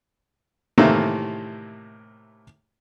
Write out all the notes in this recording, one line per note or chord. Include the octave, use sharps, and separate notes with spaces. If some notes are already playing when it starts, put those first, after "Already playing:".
A2 C3 D#3 E3 A3 A#3